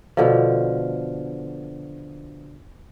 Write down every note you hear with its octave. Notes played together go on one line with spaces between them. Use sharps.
B2 D3 F3